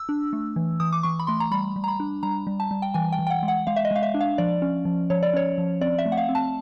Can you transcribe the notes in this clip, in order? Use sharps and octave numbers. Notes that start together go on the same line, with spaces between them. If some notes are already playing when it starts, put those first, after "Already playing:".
Already playing: E6
D4
A3
E3
E3 D#6
D6
E3 C#6
B5
A3 C6
A#5
G3 B5
G3
A#5
B5
D4
G3 A#5
G3
A5
G3
G5
E3 G#5
G5
E3
G5
F#5
G#3
F#5
G#3 F5
E5
D#5
G#3 F5
E5
D4
F5
F3 D5
C#4
F3
F3 C#5
D5
C#4 C#5
F3
C4 D5
E5
A3
F#5
F5
C4
A5